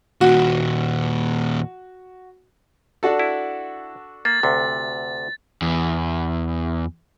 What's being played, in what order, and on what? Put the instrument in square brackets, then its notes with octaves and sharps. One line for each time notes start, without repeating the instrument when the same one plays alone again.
[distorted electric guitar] D#2 A#2 [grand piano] F#4
[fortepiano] D4 F#4 A4
[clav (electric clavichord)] E4
[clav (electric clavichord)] A#3 [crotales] A6
[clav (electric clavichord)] D2 C3
[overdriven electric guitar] E2